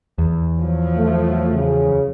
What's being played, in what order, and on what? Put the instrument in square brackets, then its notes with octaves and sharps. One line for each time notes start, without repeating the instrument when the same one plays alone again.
[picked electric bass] E2
[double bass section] F3 F#3
[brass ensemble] A3
C#3